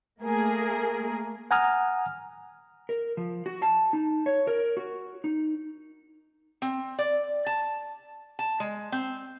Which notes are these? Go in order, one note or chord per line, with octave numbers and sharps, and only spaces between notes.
A3 A#3 G#4 A#4
F#5 G#5 A#5 D#6 F6
A#4
F3
F#4
A5
D#4
C#5
A#4
F#4
D#4
C4
D5
A5
A5
G#3
C4